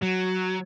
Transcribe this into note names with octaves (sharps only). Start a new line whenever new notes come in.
F#3